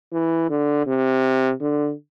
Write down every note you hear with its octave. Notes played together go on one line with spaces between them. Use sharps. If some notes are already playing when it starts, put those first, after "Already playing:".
E3
D3
C3
D3